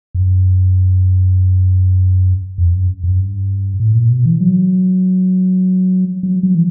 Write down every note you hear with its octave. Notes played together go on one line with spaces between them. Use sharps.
F#2
F2
F#2
F#2
G2
A2
A#2
B2
E3
F#3
F#3
F#3
E3